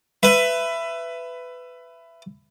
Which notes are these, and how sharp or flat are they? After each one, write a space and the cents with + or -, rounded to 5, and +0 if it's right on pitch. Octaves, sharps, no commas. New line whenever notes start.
B4 +15 E5 +20